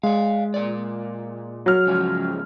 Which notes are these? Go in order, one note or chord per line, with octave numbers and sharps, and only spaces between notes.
G#3 D5 F5
A#2 D5
F#3 F6
G#2 C#3 F3